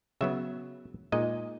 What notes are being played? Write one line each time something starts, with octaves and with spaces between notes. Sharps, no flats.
C#3 F#3 B3 E5
A#2 G#3 D#4 D#5